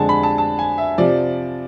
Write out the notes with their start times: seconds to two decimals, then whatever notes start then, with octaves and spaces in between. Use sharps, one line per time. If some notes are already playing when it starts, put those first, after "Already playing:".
Already playing: F2 D3 G#3 G#5 A5
0.09 B5
0.23 A5
0.38 A5
0.59 G#5
0.78 E5
0.98 C3 F3 D5